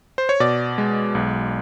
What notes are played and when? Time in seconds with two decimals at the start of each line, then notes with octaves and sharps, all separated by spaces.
0.18 C5
0.29 C#5
0.40 B2 D5
0.78 G#3
1.15 B1